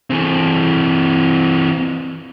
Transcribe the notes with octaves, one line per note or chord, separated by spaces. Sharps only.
E3 C4